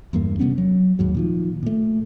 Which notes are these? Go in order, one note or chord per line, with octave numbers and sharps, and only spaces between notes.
E2 G2 G3 A#3
C3 G3 B3 C#4
F#3
D#2 G#2 F#3
A#2 D#3 F3
A#2 A3